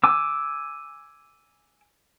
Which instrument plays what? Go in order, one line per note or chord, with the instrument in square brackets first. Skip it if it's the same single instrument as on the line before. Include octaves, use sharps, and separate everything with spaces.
[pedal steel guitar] G#5 D6 E6